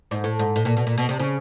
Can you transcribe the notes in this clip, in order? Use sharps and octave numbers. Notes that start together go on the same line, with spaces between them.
G#2
A2
G#2
A2
A#2
B2
A#2
B2
C3
C#3